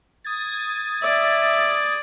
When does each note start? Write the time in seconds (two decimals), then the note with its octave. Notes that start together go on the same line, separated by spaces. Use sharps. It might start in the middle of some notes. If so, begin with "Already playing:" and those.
0.24 D#6 G#6 A6
1.03 D5 E5